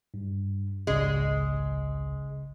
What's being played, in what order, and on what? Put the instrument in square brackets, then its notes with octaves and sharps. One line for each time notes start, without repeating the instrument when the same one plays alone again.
[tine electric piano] G2
[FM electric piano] G#1 C#2 [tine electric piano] C#3 [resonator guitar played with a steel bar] G#3